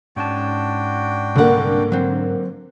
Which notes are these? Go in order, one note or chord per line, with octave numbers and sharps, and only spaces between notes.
G#2 C#4 D4 F#4 G5 A5
C2 D3 A#3 F#5
F#3 C4